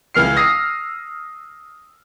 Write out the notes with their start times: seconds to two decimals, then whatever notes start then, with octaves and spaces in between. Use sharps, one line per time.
0.14 C#2 E3 F6 C7
0.36 D#6 E6 A#6 C7